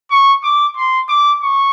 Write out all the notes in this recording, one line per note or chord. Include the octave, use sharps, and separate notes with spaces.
C#6
D6
C6
D6
C#6